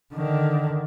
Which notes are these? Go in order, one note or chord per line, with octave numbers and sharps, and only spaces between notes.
D3 D#3